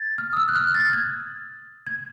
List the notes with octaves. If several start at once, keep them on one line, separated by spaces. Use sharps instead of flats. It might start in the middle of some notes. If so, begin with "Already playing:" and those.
Already playing: G#6 A6
F6
D#6
E6
F#6
F6
A6
G#6
G#6